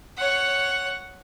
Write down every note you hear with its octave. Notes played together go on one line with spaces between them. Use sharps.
C#5 F#5